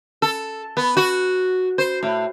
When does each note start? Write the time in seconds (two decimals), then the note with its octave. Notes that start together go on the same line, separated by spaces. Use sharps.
0.22 A4
0.77 B3
0.97 F#4
1.78 C5
2.03 A2